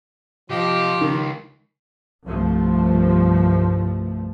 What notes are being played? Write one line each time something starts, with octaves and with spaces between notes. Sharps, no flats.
C3 F3 G4 D#5
C#2 D#3
C2 G2 F3 A3